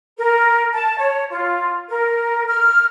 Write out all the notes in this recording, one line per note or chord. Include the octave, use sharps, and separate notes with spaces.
A#4
A5
C#5
F4
A#4
F6